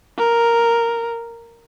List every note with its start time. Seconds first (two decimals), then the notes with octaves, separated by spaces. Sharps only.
0.18 A#4